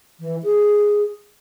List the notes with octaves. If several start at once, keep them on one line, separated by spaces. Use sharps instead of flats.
E3
G#4